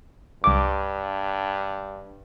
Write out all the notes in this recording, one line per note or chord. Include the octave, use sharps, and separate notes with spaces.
C2 G2 D6